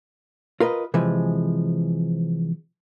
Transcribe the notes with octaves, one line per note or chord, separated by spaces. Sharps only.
F4 A#4 B4 D#5
C3 E3 F3 G#3